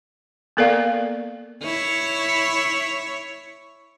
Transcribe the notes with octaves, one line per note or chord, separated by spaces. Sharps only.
A#3 B3 A4 A#4 D5 F5
E4 C#5